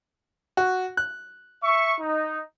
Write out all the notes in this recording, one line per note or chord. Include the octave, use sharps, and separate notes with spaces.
F#4
F#6
E5 C#6
D#4